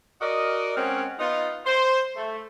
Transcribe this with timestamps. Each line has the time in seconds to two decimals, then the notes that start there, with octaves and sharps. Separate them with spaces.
0.21 F#4 A#4 D5 D#5
0.77 G#3 C4 C#4 A#4 C#5 F#5
1.19 B3 D#4 F4
1.66 C5
2.16 A3